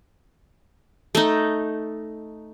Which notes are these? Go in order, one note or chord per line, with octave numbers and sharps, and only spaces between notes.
A3 D#4